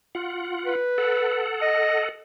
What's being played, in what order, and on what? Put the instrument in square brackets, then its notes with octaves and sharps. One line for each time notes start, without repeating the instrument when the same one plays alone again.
[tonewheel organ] F4 F#5
[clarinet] B4
[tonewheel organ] A4 F#5
[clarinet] D#5